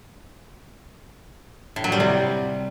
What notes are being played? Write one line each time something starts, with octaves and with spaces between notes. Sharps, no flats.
A2
F#3
G3
C3